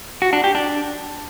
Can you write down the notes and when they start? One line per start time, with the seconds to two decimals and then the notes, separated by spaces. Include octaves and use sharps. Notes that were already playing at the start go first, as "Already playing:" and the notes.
0.22 F#4
0.33 D4
0.44 G4
0.55 D4